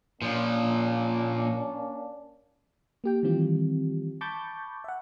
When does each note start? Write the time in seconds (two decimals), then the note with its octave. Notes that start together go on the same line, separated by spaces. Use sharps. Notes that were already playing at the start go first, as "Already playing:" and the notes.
0.22 A#2 F3 A#3 C#4 D4
3.04 A#3 G4 G5
3.23 D#3 E3 G3 C4 F4 G4
4.21 A5 B5 C#6 D6 G6 A6
4.84 E5 F#5